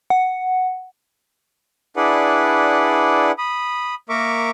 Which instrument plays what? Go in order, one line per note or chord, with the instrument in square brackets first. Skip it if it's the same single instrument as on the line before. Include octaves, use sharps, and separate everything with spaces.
[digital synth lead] F#5
[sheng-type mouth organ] D4 E4 G#4 B4 D5 F#5
B5 D#6
A#3 A#4 E5 C#6 D6